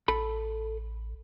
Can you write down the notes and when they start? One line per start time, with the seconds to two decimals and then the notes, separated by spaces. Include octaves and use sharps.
0.08 A1 A4 B5